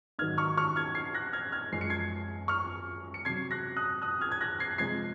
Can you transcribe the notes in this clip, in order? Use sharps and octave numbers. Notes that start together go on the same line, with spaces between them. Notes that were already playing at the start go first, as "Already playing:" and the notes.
G#2 D#3 F#3 F6 G#6
C#6 F6
C#6 F6
F6 G#6
G#6 C7
F#6 A#6
F6 G#6
F6 G#6
F#2 F3 G#3 C7
C#7
G#6 C7
C#6 F6
C#7
C3 F#3 G#6 C7
F#6 A#6
D#6 F#6
D#6 F#6
F6 G#6
G#6
F#6 A#6
G#6 C7
C3 F3 G#3 G#6 C7